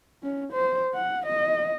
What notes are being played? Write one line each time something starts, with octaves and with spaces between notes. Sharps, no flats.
C#4
C5
F#5
D#5